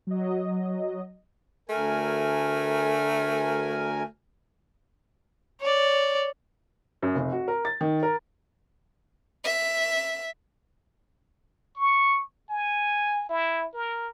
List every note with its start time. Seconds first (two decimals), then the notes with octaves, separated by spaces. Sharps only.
0.07 F#3 D#5
1.69 D2 A3 A#4 G#5
5.61 C#5 D5
7.02 F#2
7.15 F1
7.32 F#4
7.48 A#4
7.65 A6
7.81 D#3
8.03 A#4
9.44 E5
11.76 C#6
12.50 G#5
13.29 E4
13.74 A#4